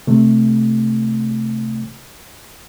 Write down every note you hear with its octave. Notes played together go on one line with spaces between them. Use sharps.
C3 A3